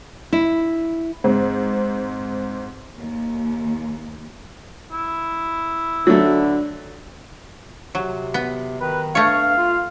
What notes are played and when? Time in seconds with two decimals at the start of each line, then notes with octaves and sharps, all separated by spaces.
0.33 E4
1.24 G#2 C4
2.96 D#2
4.92 E4
6.07 D2 D3 F#3 A3
7.95 C3 F#3
8.34 B3
8.81 D#3 B4
9.15 G2 A3 C#5 F5
9.57 F4